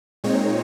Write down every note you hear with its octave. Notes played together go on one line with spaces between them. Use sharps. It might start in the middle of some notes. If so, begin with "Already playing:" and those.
A#2 G#3 C4 D#4 C#5